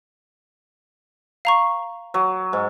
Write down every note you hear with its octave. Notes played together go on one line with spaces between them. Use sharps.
F5 A#5 C#6
F#3
G#2